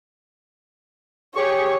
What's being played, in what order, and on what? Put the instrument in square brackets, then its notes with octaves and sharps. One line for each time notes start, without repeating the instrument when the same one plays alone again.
[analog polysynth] G4 G#4 C#6 [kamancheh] C#5